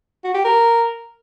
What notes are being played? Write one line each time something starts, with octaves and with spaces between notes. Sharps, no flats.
F#4
G4
A#4